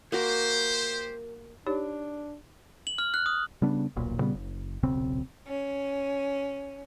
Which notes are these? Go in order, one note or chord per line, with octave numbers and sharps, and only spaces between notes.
A#3 F#4 G4 A#4 C5
D4 D#4 G4 C#5
F#7
F6
F#6
D#6
C#3 G3 B3 D4
D#1 B1 A#2
A#2 C#3 G3 B3
F#1
D#1 B1 C#3 C4
C#4